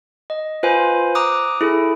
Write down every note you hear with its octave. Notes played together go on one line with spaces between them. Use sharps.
D#5
F4 B4 C5 F5 G#5
A#5 D6 D#6 F#6
E4 G#4 A4